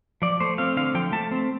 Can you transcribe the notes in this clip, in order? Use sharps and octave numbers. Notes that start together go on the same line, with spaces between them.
F3 D5
A3 C5
C4 F5
D3 F5
F3 G5
A3 A5
C4